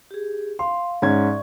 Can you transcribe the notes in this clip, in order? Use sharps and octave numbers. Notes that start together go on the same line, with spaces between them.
G4 G#4
F5 C6
G#2 C#4 D5 E5 C#6 G#6